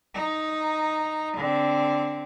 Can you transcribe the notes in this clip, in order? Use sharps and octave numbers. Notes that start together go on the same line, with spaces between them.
D#4
D3 C4